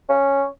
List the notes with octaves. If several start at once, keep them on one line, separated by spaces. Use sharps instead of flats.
C#4